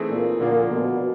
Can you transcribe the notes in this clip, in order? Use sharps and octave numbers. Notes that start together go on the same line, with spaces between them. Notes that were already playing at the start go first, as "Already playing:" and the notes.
Already playing: E3 A3 C4 D#4 G#4
A#2
A#2 D3 F3 A#3
B2